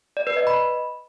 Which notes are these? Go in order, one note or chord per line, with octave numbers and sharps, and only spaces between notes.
D5
B4
D#5
B5